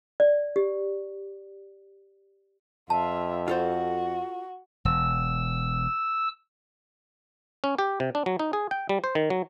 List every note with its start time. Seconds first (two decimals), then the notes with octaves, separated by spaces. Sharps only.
0.20 D5
0.56 G4
2.90 F2 F4 E5 A5
3.48 F4 F#4 A4 C5
4.85 E1 E6
7.64 C#4
7.79 G4
8.00 C3
8.15 D4
8.26 F#3
8.39 D#4
8.53 G#4
8.71 G5
8.89 G3
9.04 C5
9.15 D#3
9.30 F#3